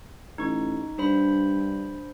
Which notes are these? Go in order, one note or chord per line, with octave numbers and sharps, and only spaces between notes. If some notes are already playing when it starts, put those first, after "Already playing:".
A1 D#4 C#6
G2 D4 C5 B5